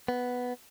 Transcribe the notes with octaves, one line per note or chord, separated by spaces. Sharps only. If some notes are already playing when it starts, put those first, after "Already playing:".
B3